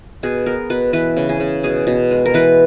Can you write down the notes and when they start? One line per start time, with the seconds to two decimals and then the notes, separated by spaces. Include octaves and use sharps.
0.23 B2 G#4
0.46 B3 A#4
0.70 B2 B4
0.93 E3 B4
1.17 C#3
1.29 G#4
1.40 C#3
1.63 B2 G#4
1.87 B2
2.11 G#3
2.26 A#4
2.34 E3 B4